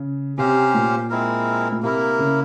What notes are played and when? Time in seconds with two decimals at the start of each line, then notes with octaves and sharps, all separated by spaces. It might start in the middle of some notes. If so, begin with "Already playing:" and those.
Already playing: C#3
0.37 C3 C#4 G4 C5 F5
0.74 A#2
1.10 G#3 C4 E4 A#4
1.72 A#2
1.83 C3 A#3 E4 A#4
2.19 C#3